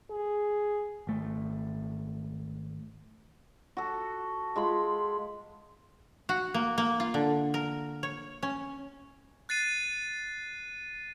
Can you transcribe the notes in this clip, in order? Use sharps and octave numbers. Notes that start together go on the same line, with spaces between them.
G#4
G#1 A3
F#4 A4
G#3 F4 B5
F#4
A#3
A#3
F4
D3
A#4
C#5
C#4
F#6 A6 C7 D#7